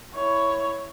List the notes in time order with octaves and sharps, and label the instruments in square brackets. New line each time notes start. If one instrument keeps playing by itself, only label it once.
[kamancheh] E4 C#5